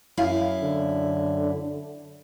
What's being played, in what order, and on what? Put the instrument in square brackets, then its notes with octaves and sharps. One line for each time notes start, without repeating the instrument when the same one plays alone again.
[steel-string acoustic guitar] F#2 E4 F5
[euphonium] D3